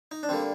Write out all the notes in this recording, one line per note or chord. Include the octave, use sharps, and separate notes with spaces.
D#4
D4
D3 G3 A#3 C4